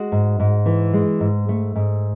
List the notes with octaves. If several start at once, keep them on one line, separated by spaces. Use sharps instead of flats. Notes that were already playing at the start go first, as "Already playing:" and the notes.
Already playing: G#3 F#4
G#2
G#2
E3
G#3
G#2
A3
G#2